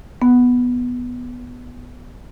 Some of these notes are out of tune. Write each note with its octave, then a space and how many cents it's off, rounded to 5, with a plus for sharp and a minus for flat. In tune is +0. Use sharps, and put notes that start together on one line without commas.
B3 -5